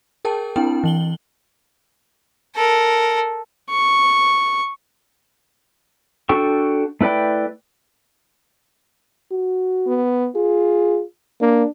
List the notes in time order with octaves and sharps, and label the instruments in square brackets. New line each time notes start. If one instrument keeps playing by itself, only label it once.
[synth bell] G#4 A#4 G5 A5
C4 D4 E4 G5
E3 F#7 G7
[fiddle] A4 A#4
[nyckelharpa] C#6
[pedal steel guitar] D4 F#4 A4 G5 C#6
A3 E4 B4 D5 G5
[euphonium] F#4
[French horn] B3
[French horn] F4 [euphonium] G#4
[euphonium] A#3 [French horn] D4